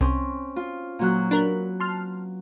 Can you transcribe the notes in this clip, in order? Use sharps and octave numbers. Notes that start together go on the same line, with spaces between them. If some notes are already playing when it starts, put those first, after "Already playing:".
C2 C4 C#4
F4
A#2 F#3 F#6
D4 A#4 B4
A5 C6 F6